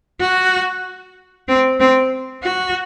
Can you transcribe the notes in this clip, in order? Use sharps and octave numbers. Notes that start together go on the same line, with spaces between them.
F#4
C4
C4
F#4